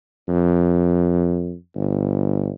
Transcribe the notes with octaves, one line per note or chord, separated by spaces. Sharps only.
F2
G1